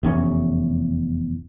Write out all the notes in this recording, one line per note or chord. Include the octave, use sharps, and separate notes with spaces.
F1 E2 C#4